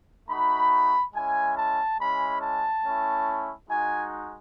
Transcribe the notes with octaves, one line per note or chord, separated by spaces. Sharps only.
A3 D#4 F#4 B5
G#3 C#4 E4 G#5
A5
G#3 C#4 E4 B5
A5
A3 C#4 E4
G#3 D#4 F#4 G#5